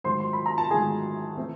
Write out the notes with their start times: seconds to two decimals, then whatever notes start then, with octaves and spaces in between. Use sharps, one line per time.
0.04 G#2 D#3 F#3 A3 C5 C6
0.20 C6
0.33 B5
0.46 A#5
0.58 A5
0.71 G#2 D#3 F#3 A3 G#4 G#5
1.37 E3 A3 C4